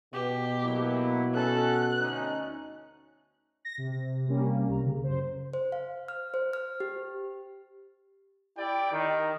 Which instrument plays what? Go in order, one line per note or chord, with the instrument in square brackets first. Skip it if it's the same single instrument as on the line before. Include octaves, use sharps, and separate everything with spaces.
[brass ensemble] B2 [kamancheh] G4
[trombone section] F#3 A#3 E4
[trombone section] C#4 A4 [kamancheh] F#6
[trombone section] D2 C#4 D#4
[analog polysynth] A#6
C3
C3 G3 A#3 C#4
C2 A#5
C#3
F#2 C5
[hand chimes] C5
F5
F6
C5
F6
G4
[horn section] E4 G4 D5 G5
D#3